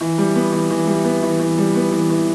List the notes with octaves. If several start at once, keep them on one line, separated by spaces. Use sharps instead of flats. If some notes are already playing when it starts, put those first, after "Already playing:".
E3
G3
B3
E3
E3
G3
B3
E3
E3
G3
B3
E3
E3